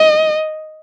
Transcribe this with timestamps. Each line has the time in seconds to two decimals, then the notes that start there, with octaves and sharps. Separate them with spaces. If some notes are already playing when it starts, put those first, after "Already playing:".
Already playing: D#5